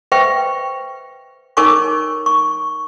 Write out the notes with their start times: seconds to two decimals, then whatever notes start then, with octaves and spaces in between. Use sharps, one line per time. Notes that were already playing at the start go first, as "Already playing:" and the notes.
0.12 B4 C5 E5 G5 C#6
1.57 D#4 A#4 C#5 G#5 C#6 D6
2.26 C#6